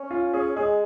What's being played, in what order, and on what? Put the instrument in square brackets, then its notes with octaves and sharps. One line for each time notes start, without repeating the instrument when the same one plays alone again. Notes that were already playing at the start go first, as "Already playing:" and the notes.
Already playing: [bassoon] C#4
[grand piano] F4
[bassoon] C#4 [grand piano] G#4
[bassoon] G#3 [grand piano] G#4